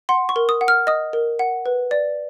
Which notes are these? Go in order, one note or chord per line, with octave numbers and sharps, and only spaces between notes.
F#5 C6
C#6
A#4
D#6
F#5
F6
D#5 D#6
A#4
F#5
B4
D5